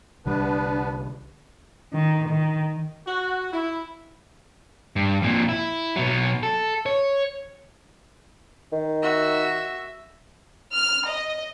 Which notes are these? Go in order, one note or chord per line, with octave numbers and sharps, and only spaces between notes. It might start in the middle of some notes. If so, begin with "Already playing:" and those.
C2 D3 G3 B3 D4 B4
D#3
D#3
F#4
E4
G2
F2 A#2
E4
B2 F#3
A4
C#5
D#3
F#4 E5
F6
D#5